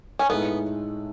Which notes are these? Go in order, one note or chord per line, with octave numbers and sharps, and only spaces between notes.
C#4
A2 G#3 B3 D#4 A4